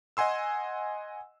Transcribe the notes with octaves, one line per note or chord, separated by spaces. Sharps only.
D#5 F#5 G#5 C6 E6